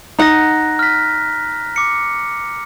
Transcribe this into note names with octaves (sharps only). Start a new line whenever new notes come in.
D#4 F#5 A#5 F#6 A#6
F6 B6
D6 C#7